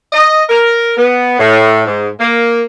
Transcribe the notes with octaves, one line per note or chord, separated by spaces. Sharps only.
D#5
A#4
B3
A2
G#2
A#3